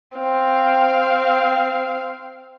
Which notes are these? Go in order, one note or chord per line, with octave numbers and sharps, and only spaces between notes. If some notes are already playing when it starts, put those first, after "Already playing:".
C4 F5